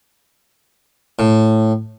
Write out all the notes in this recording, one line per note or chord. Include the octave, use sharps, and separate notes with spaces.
A2